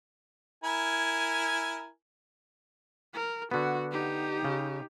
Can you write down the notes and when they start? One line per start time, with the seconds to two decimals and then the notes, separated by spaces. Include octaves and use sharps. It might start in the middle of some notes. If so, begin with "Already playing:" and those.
0.64 E4 A#4 G#5
3.14 A#4
3.51 D3 B3 F#4
3.92 D#4 G4
4.44 C#3